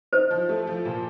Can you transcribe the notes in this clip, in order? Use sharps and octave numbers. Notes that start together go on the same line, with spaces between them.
D#4 C5
F3
A3
F3
A#2